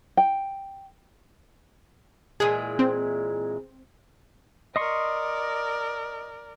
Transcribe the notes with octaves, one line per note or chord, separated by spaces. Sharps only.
G5
A#2 E3 G#3 G#4
C4
A#4 D5 D#5 C6 C#6